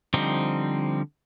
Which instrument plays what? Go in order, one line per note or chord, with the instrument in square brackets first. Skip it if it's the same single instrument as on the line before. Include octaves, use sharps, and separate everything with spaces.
[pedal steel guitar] D3 F3 G3 C4 D#4